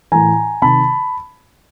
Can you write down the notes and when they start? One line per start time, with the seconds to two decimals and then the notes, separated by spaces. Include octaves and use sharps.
0.12 A2 E3 G#5 A#5
0.62 C3 D#3 A5 B5